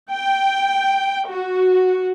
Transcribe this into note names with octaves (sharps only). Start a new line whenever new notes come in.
G5
F#4